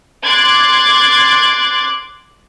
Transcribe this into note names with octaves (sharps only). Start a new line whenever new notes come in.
C6 D6 F#6 G#6 A6